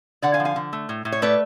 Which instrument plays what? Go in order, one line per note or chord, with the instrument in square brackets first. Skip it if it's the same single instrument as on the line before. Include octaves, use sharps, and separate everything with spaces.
[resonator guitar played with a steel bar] D3 D5 F#5
F5 G#5
F3
F5 G#5
D3
A3
A2
A2
C#5
A3 B4 D5